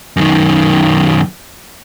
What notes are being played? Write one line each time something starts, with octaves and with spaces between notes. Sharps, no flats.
F#2 D#3